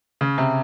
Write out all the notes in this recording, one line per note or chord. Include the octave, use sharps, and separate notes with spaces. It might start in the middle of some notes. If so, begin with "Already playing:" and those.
C#3
C3